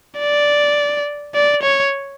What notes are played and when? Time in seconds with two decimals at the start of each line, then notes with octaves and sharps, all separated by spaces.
0.19 D5
1.34 D5
1.63 C#5